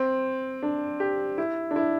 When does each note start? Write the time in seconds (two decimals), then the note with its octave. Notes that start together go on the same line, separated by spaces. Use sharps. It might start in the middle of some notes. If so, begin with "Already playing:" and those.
Already playing: C4
0.62 D4
1.00 G4
1.38 E4
1.71 D4
1.76 E4